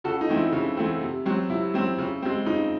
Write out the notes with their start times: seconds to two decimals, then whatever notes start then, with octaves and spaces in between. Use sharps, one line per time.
0.04 C#3 F#4 A4
0.21 D#4
0.29 E3 A3 C4
0.37 E4
0.52 C#3
0.77 E3 A3 C4
1.01 C3
1.26 F#3 C4
1.50 C3 E4
1.74 F#3 C4
1.98 C#3
2.22 G#3 C4
2.46 C#3 D#4